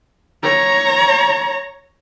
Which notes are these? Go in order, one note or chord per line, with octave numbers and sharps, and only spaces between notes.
C#5 A#5